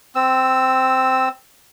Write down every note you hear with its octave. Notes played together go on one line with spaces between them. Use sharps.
C4 E6